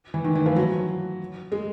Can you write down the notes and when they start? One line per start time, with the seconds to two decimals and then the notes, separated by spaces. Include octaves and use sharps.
0.14 E3
0.24 D#3
0.35 E3
0.46 F3
0.56 F#3
1.52 G#3